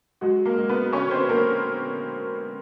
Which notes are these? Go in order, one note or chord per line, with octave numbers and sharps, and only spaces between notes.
F#3 G#3 F#4
A#3 A#4
G#3
B3 B4
D3 C#4 C#5
C4 C5
D3 A#3 A#4